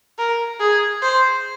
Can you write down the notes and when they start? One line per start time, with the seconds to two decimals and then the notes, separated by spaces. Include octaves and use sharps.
0.18 A#4
0.60 G#4
1.02 C5